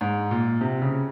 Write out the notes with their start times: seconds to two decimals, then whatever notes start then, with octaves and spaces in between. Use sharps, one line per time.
0.01 G#2
0.31 A#2
0.61 C3
0.82 C#3